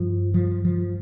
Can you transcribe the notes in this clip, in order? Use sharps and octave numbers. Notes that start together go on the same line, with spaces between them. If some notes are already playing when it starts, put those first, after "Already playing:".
Already playing: G2 F3
F3
F3